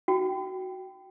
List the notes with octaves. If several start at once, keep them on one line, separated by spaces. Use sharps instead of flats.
F#4 G5